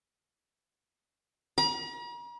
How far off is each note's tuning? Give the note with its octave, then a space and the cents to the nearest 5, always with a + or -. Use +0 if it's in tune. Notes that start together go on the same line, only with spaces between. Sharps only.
A#5 +45